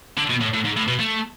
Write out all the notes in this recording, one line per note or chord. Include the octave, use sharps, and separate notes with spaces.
D3
B2
A2
A2
G#2
A2
B2
A3